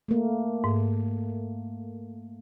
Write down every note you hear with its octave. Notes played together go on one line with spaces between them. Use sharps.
A3 A#3
G#2